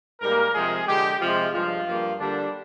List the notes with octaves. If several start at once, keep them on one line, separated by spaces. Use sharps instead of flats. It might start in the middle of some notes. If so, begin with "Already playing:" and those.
G#2 G3 A#3 A#4
C3 F3 G#3 G#4
D3 G#3 G4
C3 F3 G#3 F4
G2 F3 G#3 F4
G2 F3 A#3
D3 G3 A#3 D4